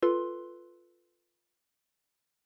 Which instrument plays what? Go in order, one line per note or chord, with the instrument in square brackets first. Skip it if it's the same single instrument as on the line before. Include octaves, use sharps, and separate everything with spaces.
[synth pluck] F4 A4 B4 C6